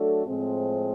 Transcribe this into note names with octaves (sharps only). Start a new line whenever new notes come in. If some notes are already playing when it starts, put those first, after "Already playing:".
Already playing: F#3 A3 D4 F#4 A4
A2 F3 G#3 C4